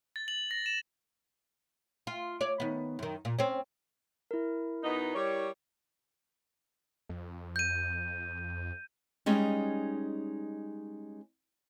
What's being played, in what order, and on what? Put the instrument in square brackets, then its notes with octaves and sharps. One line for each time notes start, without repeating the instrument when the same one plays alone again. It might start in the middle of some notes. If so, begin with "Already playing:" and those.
[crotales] A6
F#7
A#6
E7
[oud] F4
C#5 D5
D#3 B3
F#2 D#3
A#2
C4 C#4
[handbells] E4 A#4
[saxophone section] B2 B3 D#4
G3 C#5
[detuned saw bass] F2
[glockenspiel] G6 D#7
[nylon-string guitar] G3 G#3 C#4 D#4